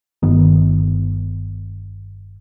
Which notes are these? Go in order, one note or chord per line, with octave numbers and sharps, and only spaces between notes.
G1 D#3 B3